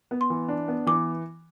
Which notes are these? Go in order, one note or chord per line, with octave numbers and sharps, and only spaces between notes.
B3
C6
E3
D4
B3
E3 D6